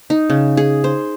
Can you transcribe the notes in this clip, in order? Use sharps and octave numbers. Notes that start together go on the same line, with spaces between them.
D#4
C#3
G#4
C5